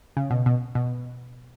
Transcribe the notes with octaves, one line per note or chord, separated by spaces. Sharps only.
C#3
B2
B2
B2